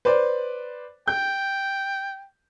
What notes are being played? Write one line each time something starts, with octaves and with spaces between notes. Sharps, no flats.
B4 C5 D5
G5 G6